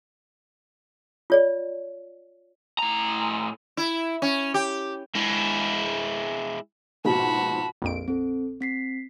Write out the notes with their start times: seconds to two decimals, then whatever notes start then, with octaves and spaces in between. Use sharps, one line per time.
1.30 F4 C#5 D5
2.79 A2 A#5
3.77 E4
4.22 C#4
4.54 G4
5.15 G#3 E4
7.05 A#1 G#2 B2 F#4 A5 B5
7.82 A#1 F2 D7
8.08 C4 A4
8.60 C4 B6 C7